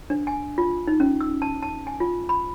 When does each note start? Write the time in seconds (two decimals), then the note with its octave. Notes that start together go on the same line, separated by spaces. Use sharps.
0.10 D4
0.27 G#5
0.58 F4
0.87 D#4
1.00 C#4
1.21 E6
1.42 A5
1.62 A5
1.87 G#5
2.00 F4
2.29 B5